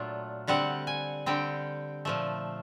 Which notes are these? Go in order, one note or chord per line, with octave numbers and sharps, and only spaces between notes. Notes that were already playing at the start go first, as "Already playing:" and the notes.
Already playing: A#2 F#3 A3 D4 F4
D3 G3 C4 F#5
G#5
D3 G3 C4 G5
A#2 F3 A3